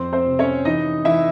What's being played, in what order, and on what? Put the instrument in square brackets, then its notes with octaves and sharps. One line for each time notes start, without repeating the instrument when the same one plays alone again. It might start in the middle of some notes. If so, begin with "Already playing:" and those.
Already playing: [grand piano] F2 C4 C5
C4 C5
C3
C#4 C#5
E3 D#4 D#5
E3 E4 E5